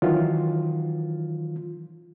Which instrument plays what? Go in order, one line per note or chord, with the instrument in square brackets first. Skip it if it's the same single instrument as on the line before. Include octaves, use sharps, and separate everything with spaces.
[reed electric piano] D#3 E3 F#3 F4